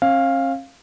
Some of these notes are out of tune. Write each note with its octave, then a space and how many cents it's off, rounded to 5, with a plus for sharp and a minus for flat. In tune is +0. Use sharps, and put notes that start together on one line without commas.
C#4 -45 F5 +0